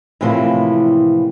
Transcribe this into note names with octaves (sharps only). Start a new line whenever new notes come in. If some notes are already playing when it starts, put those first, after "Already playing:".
A2 C3 E3 F3 G3 A#3